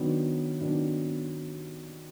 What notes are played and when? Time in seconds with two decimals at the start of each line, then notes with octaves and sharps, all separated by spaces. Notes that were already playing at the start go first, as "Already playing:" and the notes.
Already playing: D#3 F#3 B3 D4
0.61 D#3 F#3 B3 D4